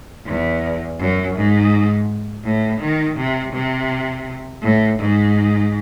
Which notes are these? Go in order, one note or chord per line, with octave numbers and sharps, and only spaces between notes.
E2
F#2
G#2
A2
D#3
C3
C3
A2
G#2